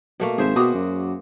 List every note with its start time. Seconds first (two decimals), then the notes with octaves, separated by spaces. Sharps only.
0.20 B2 A3 A#3
0.38 G#1 G#4 C5 E5
0.56 B2 F#4 D6 D#6
0.75 F#2